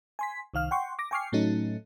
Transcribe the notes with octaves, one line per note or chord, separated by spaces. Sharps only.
G#5 C6 B6
C2 D#3 F5 F6
F#5 G5 C6 C#6
D6 A#6
G5 G#5 C#6 D6 F6 C7
A2 F#3 A3 C#4 D#4